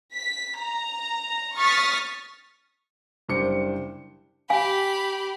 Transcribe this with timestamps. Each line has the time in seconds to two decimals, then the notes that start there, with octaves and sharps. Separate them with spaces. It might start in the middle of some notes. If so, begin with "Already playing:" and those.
0.14 B6
0.61 A#5
1.58 C#6 D#6 F6 A6 B6
3.29 F#1 G3 D4 C5 D6 C#7
4.50 G4 F5 G#5 B5